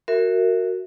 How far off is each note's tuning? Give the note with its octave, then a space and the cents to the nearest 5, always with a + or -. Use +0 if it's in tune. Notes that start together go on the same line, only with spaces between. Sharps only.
F#4 +0 A#4 -20 E5 +0